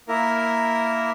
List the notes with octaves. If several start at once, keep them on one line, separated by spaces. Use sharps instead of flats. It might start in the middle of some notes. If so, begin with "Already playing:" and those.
A#3 E4 A#4